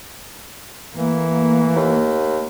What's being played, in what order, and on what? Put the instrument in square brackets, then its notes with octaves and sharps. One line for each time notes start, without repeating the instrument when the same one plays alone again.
[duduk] E3 [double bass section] A3 A#3
[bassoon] D#2